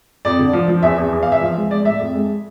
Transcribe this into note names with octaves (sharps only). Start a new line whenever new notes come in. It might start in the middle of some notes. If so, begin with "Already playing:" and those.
F2 D5
D3
F3
F3
E2 E5
E2
E2
F5
E2
E5
F3
G#3
G#3 D5
A2 E5
F2
G#3